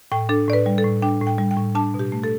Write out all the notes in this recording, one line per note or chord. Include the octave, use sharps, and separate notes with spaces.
A2 G5
D4 A4
A2 D5
B4
G3
A4
A2
D4 G5
A2
G5
G3
G5
A2
D4 A5
B2
G4
A3
A4